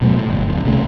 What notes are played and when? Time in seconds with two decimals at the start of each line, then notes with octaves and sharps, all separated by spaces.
0.01 D#1 B2 F#3 A3
0.16 A2
0.29 G1
0.48 D1
0.64 C2 C#3 A3